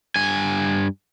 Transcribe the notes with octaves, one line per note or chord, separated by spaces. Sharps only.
G2 G#5